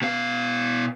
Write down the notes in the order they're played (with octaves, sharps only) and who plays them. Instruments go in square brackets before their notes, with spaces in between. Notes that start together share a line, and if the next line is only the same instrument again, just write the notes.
[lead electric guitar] B2 F5